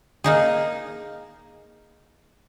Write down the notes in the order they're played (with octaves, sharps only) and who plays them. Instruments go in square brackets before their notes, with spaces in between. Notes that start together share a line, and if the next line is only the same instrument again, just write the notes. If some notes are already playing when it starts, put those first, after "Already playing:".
[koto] A#3 D#4 G#4